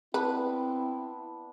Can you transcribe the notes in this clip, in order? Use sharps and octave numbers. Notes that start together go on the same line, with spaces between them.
B3 C4 D4 E4 B4